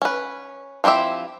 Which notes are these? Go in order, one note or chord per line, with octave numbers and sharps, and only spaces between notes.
C#4 B4
F3 C4 E4 G4 E5